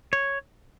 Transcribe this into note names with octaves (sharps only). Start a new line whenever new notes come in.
C#5